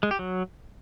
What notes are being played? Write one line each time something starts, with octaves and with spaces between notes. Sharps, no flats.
G#3
G4
F#3